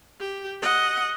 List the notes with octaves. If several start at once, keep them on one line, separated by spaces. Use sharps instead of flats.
G4
D#5 F#5